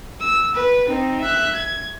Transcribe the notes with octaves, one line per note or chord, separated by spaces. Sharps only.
E6
B4
C4 D#4
E5 F#6
G#6